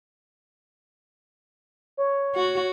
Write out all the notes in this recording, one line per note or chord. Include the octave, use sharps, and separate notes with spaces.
C#5
F#4